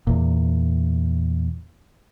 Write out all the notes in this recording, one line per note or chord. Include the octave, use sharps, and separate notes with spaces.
E2 A#2